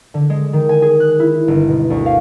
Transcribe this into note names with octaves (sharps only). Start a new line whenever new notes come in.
D3
G#3
D#3
G#5
G#4
F#6
E4
G1
B2
D2
F5